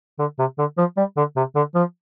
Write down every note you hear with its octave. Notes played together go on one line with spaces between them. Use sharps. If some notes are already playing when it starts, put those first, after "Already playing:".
D3
C3
D3
F3
G3
D3
C3
D3
F3